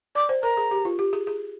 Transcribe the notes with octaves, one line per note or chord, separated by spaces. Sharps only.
D5 D6
C5
A#4 A#5
G#4
G4
F4
G4
G#4
G#4